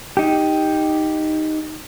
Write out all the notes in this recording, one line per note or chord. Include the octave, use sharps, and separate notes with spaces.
D#4 G4